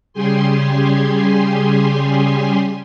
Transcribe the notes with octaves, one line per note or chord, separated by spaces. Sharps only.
C#3 G3 G4 G#4 G#5 C6